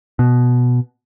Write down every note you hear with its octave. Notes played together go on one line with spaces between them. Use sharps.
B2